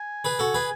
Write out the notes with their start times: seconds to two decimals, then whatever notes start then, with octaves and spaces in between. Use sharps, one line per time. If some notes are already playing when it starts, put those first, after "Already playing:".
Already playing: G#5
0.25 G#4 B4
0.39 F#4 A4
0.54 G#4 B4